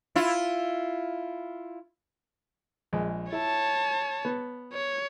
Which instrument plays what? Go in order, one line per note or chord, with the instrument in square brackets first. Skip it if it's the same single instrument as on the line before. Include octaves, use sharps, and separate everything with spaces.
[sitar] E4 F4
[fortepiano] A#1 G#3
[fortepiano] E4 [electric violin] C#5 A5
[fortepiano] B3
[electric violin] C#5